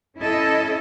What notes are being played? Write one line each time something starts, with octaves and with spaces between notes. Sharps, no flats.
C#4 E4 A4 D#5